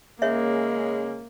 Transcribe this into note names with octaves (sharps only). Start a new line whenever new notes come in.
C#3 G#3 A#3 C#4 C#5 E5